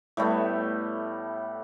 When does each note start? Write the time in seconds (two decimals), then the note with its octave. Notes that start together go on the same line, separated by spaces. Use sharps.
0.17 A2 G3 A3 B3